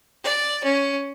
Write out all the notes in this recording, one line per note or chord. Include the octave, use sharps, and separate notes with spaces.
D5
C#4